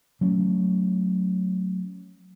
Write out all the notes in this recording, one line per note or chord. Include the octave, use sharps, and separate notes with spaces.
F#3 A3 C#4